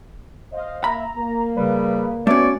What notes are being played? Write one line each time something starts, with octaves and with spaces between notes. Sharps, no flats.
C5 D#5 F5
A#3 E5 A#5 B5
A#3
C#3 G3 B4
A3 B3 C#4 F#4 C#5 D5